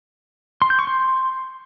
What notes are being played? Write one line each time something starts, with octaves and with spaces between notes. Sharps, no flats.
C6
G6
C#6
C6